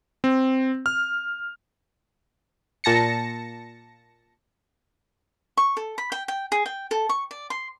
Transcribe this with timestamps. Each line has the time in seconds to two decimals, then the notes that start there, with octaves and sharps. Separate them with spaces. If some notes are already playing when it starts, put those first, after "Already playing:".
0.24 C4
0.86 F6
2.84 A#2 A5 A#6 C#7
5.57 C#6
5.77 A4
5.98 B5
6.12 G5
6.28 G5
6.52 G#4
6.66 G5
6.91 A4
7.09 C#6
7.31 D5
7.50 C6